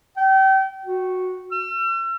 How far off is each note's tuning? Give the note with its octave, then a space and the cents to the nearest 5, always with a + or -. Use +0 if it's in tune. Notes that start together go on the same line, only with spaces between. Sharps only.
G5 -30
F#4 -5
E6 +40